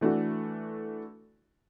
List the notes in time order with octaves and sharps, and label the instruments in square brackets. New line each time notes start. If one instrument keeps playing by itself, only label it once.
[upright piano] E3 A3 D4 F#4